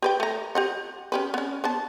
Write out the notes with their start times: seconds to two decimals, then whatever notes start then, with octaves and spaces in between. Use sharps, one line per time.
0.02 G4 B4 G5
0.20 A3 A#5
0.55 G4 D#5 F#5
1.12 C#4 G4 B4
1.34 B3 C#4
1.64 B3 D4 A5